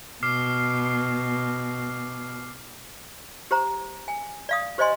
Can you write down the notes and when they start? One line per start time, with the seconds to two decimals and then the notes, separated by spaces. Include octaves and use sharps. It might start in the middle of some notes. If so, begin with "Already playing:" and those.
0.23 B2 D6 F6 C7
3.51 G4 C5 A#5
4.08 G#5
4.49 D5 F5 D#6
4.78 G4 C5 D5 D#5 G#5 C6